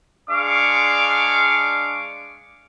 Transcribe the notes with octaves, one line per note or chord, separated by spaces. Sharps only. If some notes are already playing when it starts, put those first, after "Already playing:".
G#3 D4 F5 C#6 D6